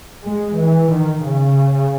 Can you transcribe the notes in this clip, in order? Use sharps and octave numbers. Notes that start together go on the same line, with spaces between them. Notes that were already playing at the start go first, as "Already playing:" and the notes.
G#3
E3
D#3
C#3